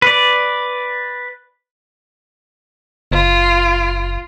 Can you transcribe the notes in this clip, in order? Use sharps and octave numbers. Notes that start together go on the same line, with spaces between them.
B4 D5
F#1 F4